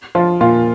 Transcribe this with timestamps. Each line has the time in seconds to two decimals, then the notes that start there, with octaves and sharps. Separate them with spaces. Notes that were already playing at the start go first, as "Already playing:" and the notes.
0.15 F3 F4
0.41 A#2 F4